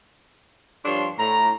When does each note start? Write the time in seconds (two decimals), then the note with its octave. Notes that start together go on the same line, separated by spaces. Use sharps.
0.85 G2 F3 D4 C#5 C6
1.19 A2 A#5